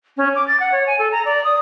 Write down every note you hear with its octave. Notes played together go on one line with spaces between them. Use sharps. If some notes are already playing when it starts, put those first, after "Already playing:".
C#4
D6
A6
F#5
C#5
G#5
A4
A#5
D5
D#6